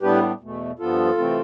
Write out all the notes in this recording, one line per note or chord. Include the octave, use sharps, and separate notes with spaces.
A2 G3 B3 D4 G4 B4
E2 B2 A3
G2 F3 B3 F4 A4
C3 E3 A3 C4